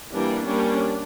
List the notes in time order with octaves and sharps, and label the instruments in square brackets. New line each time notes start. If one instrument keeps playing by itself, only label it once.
[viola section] E3 G3 A#3 D4
G3 A#3 C#4 D4